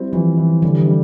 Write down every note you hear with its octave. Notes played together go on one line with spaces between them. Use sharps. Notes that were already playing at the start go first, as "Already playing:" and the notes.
Already playing: G3 C4 E4
E3 F3
E3
D3 G3
E3
G3